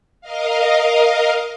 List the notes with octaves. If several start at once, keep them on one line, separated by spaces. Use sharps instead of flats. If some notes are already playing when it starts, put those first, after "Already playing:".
A#4 D#5 F5